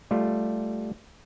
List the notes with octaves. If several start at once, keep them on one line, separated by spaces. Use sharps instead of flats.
G3 A3 F4